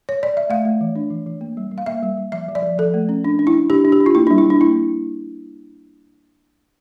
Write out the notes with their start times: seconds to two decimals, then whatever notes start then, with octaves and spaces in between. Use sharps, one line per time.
0.09 C#5
0.23 D5
0.37 E5
0.50 A3 F5
0.65 A3
0.81 E3
0.96 D4
1.10 E3
1.26 E3
1.41 A#3
1.57 G3
1.71 G3
1.78 F5
1.86 A#3 E5
2.03 G3
2.18 G3
2.32 F3 E5
2.48 F3
2.55 D5
2.63 F3
2.78 F3 A4
2.94 A3
3.09 C#4
3.24 D4
3.39 D4
3.47 E4
3.54 D4
3.70 D4 G4
3.85 D4
3.92 G4
4.00 D4
4.06 F4
4.15 A#3 E4
4.27 G3 D4
4.38 E4
4.46 G3 D4
4.61 A#3 E4